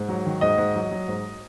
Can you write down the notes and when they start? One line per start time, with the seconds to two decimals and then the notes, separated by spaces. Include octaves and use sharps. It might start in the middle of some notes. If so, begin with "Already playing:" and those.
Already playing: G#2
0.09 F#3
0.25 D#3
0.41 G#2 D#5
0.58 G#2
0.75 F#3
0.91 F#3
1.08 G#2